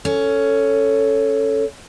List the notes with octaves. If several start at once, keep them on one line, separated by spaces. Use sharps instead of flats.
C#4 A4